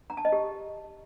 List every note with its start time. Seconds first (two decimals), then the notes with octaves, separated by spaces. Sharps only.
0.10 A#5
0.17 A5
0.25 D#5
0.32 G4